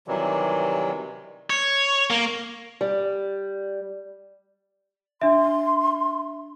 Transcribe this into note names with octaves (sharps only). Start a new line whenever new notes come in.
C3 D#3 E3 F#3 G3
C#5
A#3
G3
D4 E5 C6